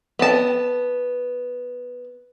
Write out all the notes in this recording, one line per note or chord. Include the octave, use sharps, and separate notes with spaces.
B3 A5